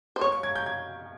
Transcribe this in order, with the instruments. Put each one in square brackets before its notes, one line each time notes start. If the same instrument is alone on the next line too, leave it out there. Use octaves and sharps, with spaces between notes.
[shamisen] C5
[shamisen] C#5 [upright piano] C#6
[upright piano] C#6
G#6
G6
G#6